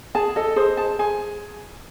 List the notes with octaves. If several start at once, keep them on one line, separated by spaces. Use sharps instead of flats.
G#4 A5
A4 D#5
G#4 C5
A5
G#4 G#5